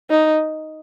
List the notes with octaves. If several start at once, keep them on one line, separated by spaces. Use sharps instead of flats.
D#4